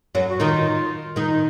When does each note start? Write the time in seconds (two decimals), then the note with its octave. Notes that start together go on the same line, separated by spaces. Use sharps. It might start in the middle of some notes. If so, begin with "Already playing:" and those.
0.15 F#2 F#3
0.30 F#4
0.40 D#3 D#4 F4
1.16 D#3 D#4